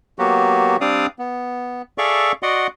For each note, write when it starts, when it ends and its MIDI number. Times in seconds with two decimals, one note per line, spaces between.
0.19 0.77 54
0.19 0.77 58
0.19 0.77 59
0.19 0.77 66
0.19 0.77 67
0.81 1.06 55
0.81 1.06 60
0.81 1.06 62
0.81 1.06 74
0.81 1.06 77
0.81 1.06 87
1.19 1.82 59
1.98 2.32 68
1.98 2.32 69
1.98 2.32 74
1.98 2.32 76
1.98 2.32 77
1.98 2.32 85
2.43 2.67 66
2.43 2.67 74
2.43 2.67 75
2.43 2.67 78
2.43 2.67 84